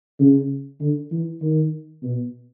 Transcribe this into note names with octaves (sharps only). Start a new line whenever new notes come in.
C#3
D3
E3
D#3
B2